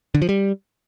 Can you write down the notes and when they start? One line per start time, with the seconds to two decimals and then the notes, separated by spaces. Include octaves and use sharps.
0.15 D3
0.22 F3
0.29 G3